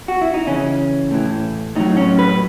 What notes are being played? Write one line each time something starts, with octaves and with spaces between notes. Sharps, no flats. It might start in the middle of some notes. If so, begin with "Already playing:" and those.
F#4
E4
D#4
C#3 E3 C#4
A2 E3
A2 F#3 D#4
C#4
B4